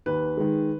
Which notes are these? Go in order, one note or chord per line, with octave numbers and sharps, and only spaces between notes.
D#2 B4
D#3 G#3